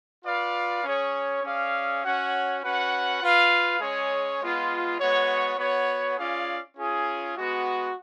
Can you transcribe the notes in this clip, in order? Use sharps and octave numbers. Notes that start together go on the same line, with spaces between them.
F4 B4 D5 F5
C#4 G#4 C#5
C#4 G#4 D5 F5
C#4 F#4 C#5 F#5
C#4 F#4 B4 F#5
F4 B4 F5
G#3 C#4 G#4 C#5
G#3 B3 F4
G#3 B3 F#4 C#5
B3 F#4 C#5
C#4 F4 G#4 D5 F5
C#4 F4 G#4
G#3 B3 F#4